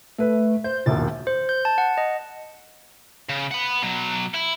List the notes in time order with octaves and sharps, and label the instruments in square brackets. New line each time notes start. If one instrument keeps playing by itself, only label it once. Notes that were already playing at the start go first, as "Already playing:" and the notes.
[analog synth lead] A3 [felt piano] B4 E5
[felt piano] C5 [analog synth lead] G6
[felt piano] E1 A#1 D#2 [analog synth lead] A6
[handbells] C5
G6
A5
F#5
D#5
[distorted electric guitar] C#3
F#5 B5
B2 F#3
E4